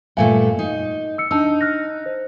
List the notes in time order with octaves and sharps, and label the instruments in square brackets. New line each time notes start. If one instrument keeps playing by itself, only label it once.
[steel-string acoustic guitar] G2 A#2 A3 [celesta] E5 F5 G#5
[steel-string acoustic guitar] D#4
[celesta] E6 C#7
[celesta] D4 A5 E6 [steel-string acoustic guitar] D#4
[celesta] F6 F#6 A#6
C5